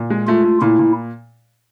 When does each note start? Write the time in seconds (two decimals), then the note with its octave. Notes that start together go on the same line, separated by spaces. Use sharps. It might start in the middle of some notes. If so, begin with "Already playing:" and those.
Already playing: A#2
0.10 G#3
0.27 A3 F4
0.44 A3
0.61 A#2 E4
0.79 A#2